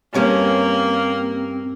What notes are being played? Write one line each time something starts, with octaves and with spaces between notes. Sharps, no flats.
G2 A#3 C4 C#4 G4